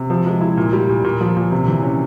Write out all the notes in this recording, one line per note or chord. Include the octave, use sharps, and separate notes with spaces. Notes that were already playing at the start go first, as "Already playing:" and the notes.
Already playing: C3
F3
G#3
E4
A#2
G3
A#2
A#2
F3
A#2
C3
E3
C#4